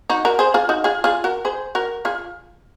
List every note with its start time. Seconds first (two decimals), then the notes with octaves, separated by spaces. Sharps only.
0.10 D#4 F#4
0.25 F#4 A#4
0.39 G#4 C5
0.54 F4 G#4
0.69 D#4 F#4
0.84 F4 G#4
1.04 F4 G#4
1.24 F#4 A#4
1.45 G#4 C5
1.75 F#4 A#4
2.05 F4 G#4